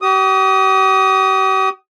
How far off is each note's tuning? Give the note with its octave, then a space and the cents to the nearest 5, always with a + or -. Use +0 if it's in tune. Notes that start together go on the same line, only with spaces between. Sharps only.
G4 -45 D#6 +0